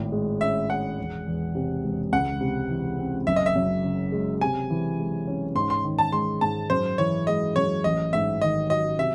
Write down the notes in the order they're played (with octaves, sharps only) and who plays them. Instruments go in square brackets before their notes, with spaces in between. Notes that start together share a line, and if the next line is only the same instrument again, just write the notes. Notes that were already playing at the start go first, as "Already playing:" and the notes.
Already playing: [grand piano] G#1 A2
G#3
[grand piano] C#4 [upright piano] E5
[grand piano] G#4 [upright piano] F#5
[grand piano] E1
E2
C3
E1
[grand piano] C#2 [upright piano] F#5
[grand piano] C3
E3
C4
[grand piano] F#1 [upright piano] E5
[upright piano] D#5
E5
[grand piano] F#2
C#3
G#3
[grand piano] C3 [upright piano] G#5
[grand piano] E3
G#3
C#4
[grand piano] G#2 [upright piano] C6
[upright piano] C6
[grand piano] D#3
[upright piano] A5
[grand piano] G#3 [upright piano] C6
[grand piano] G#2 [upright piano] A5
[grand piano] F#2 [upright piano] C5
[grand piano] E3 [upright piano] C#5
[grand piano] G#3 [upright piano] D#5
[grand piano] F#2 [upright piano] C#5
[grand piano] A1 [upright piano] D#5
[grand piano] G#2 [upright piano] E5
[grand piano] D#3 [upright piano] D#5
[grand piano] F#3 [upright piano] D#5
[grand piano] C3 [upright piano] E5